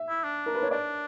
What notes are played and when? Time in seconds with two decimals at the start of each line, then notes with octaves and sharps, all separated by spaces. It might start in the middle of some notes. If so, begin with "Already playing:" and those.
Already playing: E5
0.09 E4
0.24 D4
0.46 A#4
0.55 B4
0.63 C#5
0.71 D4 D5